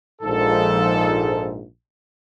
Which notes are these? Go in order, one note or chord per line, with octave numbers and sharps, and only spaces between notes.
A#1 G#2 F3 A4